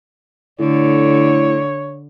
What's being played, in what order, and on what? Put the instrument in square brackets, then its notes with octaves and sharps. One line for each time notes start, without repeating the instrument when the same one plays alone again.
[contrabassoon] A2 [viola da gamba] D3 [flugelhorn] C#5